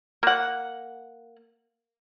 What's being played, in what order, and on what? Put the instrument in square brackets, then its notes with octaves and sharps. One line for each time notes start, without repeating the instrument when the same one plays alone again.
[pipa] A#3 F#5